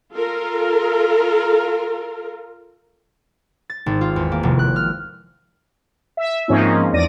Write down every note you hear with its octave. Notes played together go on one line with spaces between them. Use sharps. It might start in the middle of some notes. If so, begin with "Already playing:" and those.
F4 A4 A#4
A6
G#1
F4
E2
A#3
F1
F#6
F6
E5
G#2 F3 A#3 C4 C#4 D#4
E2 D5 A#6 D#7